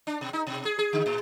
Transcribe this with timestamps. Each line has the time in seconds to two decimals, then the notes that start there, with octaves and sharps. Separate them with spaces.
0.07 D4
0.21 B2
0.33 D#4
0.47 B2
0.65 G#4
0.79 G#4
0.93 D3
1.06 A2